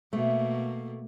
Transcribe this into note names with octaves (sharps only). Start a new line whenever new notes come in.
B2 A3 A#3